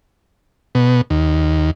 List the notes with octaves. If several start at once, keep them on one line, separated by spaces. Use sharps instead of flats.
B2
D#2